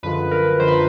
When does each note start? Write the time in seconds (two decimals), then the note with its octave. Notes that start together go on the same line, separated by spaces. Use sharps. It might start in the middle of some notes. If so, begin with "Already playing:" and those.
0.03 F#2 D3 F3 G#3 B4
0.31 A#4
0.60 F#2 D3 F3 G#3 C5
0.68 B4